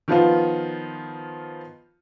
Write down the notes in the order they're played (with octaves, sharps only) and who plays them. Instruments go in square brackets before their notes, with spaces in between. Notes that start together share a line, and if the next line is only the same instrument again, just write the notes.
[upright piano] D#3 F3 B3 F4